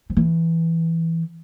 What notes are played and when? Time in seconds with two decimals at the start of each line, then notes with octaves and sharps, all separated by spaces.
0.10 F3
0.17 E3